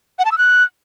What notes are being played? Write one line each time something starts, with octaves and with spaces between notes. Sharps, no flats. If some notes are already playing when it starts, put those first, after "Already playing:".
F#5
A5
E6
F#6